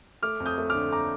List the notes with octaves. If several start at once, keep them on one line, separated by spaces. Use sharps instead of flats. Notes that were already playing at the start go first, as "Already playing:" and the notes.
A3 D6 F6
F2
D#6 G6
A3
D3 D6 F6
A#5 D6